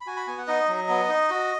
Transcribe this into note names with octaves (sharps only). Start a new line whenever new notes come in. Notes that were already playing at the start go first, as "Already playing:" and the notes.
B5
F#4 G#5
B5
B3 G#5
F#5
D#4 D#5
F#3
B3
D#4
F#4